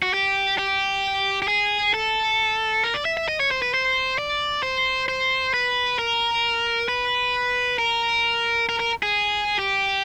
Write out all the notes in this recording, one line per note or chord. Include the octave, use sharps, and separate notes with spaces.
F#4
G4
G4
G4
G#4
A4
A#4
D5
E5
E5
D#5
C#5
C5
B4
C5
D5
C5
C5
B4
A#4
B4
A#4
A#4
A#4
G#4
G4